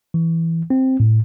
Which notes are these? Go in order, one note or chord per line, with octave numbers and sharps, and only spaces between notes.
E3
C4
A2